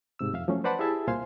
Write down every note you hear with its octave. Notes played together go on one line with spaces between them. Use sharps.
G#2 C3 E6
F2 E5 F5
F3 F#3 A3 C#4
B4 C5 D5 F#5 A5 B5
E4 G4 G#4 E5 A5
C2 A#2 C5 F5 G#5 C6